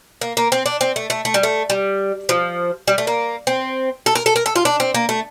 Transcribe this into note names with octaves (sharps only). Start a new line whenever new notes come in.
A#3
A#3
C4
D4
C4
A3
A3
A3
G3
A3
G3
F3
G3
A3
A#3
C4
A4
A#4
A4
A#4
A4
F4
D4
C4
A#3
A3